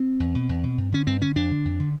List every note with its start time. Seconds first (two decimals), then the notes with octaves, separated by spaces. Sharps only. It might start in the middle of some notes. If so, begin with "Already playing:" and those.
Already playing: C4
0.20 E2
0.35 B2
0.49 E2
0.63 B2
0.78 G2
0.92 D3 C#4
1.07 G2 C4
1.21 D3 C#4
1.36 F2 D4
1.51 D3
1.65 F2
1.80 D3